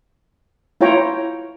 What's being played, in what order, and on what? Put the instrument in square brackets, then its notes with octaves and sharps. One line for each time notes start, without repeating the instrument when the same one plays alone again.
[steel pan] E4 F4 C#5 G5 A#5